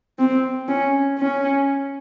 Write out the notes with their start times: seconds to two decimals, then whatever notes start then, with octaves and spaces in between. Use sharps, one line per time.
0.19 C4
0.69 C#4
1.19 C#4